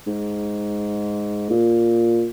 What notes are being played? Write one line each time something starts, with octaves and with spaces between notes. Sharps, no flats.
G#2
A#2